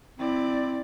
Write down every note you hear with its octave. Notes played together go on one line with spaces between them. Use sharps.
C4 E4 D5